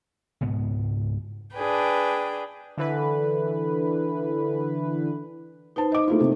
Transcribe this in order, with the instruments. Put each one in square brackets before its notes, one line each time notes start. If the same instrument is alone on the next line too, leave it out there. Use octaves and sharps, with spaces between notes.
[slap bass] C#2 G#2 B2 B3
[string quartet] D4 G#4 B4 G5
[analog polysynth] D3 E3 B4
[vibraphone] D#4 C5 [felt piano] B4 A5
[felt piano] D#5 D6
A3 E4 F4
C3 A3